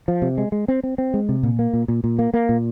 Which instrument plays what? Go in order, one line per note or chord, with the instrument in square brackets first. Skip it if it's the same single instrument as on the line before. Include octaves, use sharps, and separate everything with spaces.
[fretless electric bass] F3
C3
G#3
G#3
C4
C4
C4
G#3
C3
A#2
A#3
A#2
A#2
A#2
A#3
A#3
A#2